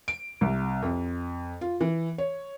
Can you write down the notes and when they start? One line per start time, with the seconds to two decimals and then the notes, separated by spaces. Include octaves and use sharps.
0.08 D7
0.41 C2
0.82 F2
1.61 F4
1.81 E3
2.18 C#5